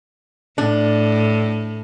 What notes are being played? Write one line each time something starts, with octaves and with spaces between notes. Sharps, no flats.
A2 D4